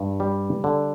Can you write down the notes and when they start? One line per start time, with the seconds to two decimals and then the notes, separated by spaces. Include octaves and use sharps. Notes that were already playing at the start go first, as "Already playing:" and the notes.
Already playing: G2
0.20 G3
0.64 D3